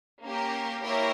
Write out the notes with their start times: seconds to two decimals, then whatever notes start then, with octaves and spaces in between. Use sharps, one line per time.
0.22 A#3 C#4 G4 A#4
0.83 A#3 E4 G4 A#4 C#5